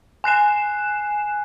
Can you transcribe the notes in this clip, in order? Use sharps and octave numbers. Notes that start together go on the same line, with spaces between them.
G#5 F#6 C7 E7